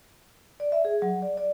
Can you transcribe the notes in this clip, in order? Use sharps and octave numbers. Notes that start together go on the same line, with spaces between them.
D5
E5
G#4
F#3
D5
D5